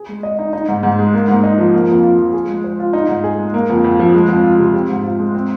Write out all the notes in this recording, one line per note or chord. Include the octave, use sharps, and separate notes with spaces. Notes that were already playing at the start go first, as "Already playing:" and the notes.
Already playing: G#4
G#3
D#5
D#4
D#4
G#2
G#2
G#3
A#3
G#2
D#4
F3
A#3
F2
F4
F3
G#4
G#3
C5
F4
D#4
G#2
G#4
G#3
A#3
F2
F2
F3
G#3
F2
F4
C3
C4
G#2
F4
G#3
C4